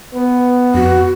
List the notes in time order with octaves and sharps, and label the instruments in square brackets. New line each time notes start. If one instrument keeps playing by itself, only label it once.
[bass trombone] B3
[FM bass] F2 [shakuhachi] F#4